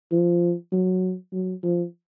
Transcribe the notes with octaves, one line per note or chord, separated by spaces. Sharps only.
F3
F#3
F#3
F3